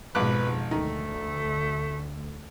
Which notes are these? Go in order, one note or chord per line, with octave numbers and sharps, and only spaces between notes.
G#1 F2 G#2 B2 B4 D6 F#6
D2 D#3 A3